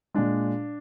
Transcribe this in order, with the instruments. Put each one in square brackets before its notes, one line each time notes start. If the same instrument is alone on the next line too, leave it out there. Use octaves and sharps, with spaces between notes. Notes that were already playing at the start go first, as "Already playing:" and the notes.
[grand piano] A#2 G#3 D4